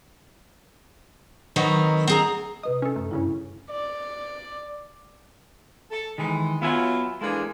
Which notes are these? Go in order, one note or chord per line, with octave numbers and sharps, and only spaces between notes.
D#3 F#3 C4 D#4 A#4 B4
C4 G#4 A#5
C3 B4 D#5 D#6
C#4 A4
F#2 A3
G2 C#3 C#4 E4
D5
A4
D#3 E3 G#3
F#3 B3 F4 E5 G#5
E3 G#3 A#3 D4 G#4 A4